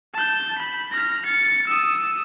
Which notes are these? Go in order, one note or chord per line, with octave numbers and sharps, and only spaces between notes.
A5 G6
B5
F6 A#6
A6 C#7
D#6 E6